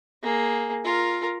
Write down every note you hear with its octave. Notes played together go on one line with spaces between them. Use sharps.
A#3 G#4
F4 A#4